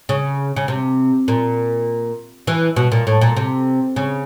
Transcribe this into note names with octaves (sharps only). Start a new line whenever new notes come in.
C#3
C#3
C3
A#2
E3
B2
A#2
A2
A#2
C3
C#3